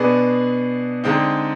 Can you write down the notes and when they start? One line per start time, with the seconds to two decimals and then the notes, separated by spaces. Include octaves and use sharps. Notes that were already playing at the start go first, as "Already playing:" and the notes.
Already playing: B2 B3 D4 G#4
1.04 D3 G#3 C4 D#4